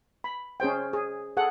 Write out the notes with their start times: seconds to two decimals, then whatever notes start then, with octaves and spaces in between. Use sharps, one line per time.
0.24 B5
0.60 C#4 G#4 C5 G5
0.93 G#4
1.37 G#4 A4 F#5